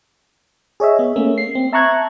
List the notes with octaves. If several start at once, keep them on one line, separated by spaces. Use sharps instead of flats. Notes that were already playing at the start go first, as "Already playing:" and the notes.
G#4 C#5 D#5 E5
B3
A3 A#3 C#4
C7
C4
E5 A5 A#5 C#6 F#6 G#6